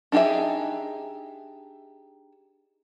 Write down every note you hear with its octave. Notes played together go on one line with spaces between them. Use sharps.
D4 D#4 G4 G#4 E5